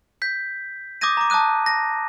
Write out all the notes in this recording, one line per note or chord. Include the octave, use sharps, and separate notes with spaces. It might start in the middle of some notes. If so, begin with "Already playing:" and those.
G6 B6
D6 D#6 G6 G#6 A#6 D#7
A#5 D6
A5 D6 D#6 F#6 D#7
A#6